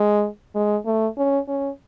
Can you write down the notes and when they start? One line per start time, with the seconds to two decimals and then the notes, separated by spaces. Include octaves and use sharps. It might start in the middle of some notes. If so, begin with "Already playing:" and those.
Already playing: G#3
0.55 G#3
0.86 A3
1.18 C#4
1.48 C#4